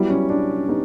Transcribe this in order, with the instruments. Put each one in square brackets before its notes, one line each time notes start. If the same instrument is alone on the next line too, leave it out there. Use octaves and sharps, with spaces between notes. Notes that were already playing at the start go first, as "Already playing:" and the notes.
Already playing: [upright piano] F#3 B3 E4 [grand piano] G3
[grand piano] C#4
D4
[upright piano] B3 D#4 G4